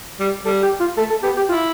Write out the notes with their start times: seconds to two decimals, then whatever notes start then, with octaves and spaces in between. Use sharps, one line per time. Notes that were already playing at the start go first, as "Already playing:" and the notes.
0.20 G3
0.46 G3 A4
0.62 G4
0.80 F4
0.97 A3 A4
1.10 A4
1.23 B3 G4
1.37 G4
1.49 E4 F4